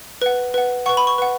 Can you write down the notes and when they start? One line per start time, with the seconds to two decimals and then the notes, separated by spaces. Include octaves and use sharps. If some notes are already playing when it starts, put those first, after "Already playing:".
0.22 B4 F#5
0.54 B4 F#5
0.86 B4 F#5 C#6
0.97 B5
1.07 C#6
1.18 B4 F#5